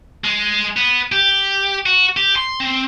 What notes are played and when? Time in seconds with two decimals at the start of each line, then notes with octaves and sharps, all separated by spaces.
0.24 G#3
0.77 B3
1.12 G4
1.86 F#4
2.17 G4
2.36 C6
2.60 C4